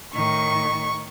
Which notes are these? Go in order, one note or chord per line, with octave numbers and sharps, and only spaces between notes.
A2 D#3 C#6